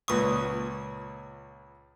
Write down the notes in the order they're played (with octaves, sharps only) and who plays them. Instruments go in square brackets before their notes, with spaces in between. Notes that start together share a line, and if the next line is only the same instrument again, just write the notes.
[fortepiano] C#2 A#2 D#6 [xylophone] B4 C#6